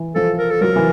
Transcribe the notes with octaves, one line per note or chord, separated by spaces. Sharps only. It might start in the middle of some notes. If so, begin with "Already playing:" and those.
Already playing: E3
F3 A4
A#4
A4
F#3 A#4
E3